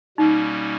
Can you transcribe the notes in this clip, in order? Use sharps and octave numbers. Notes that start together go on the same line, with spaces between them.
B2 G3 A#3 C#4 D#4